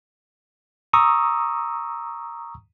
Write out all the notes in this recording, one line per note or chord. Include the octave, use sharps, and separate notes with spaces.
A#5 C#6 D#6 E6